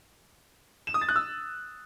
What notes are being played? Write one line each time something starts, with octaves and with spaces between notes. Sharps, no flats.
E7
D#6
A6
F#6
E6